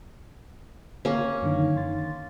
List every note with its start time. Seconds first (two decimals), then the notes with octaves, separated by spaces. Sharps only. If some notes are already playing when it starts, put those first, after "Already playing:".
1.05 A#3 C#4
1.42 F#2 D3 D#3
1.76 D#3 C6 A6